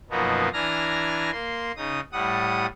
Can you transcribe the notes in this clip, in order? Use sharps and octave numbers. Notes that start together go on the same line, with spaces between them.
F#2 B2 F3 A#3 B3 D#4
E3 D4 G#5 A#5 F6 A#6
A#3 C6
C#3 D#4 D#6
A2 G3 F#5 D#6